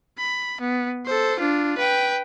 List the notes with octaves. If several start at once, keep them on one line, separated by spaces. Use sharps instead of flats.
B5
B3
A4 C5
D4 F4
B4 G5